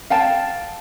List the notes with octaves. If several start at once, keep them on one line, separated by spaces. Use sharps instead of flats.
F5 G5 A5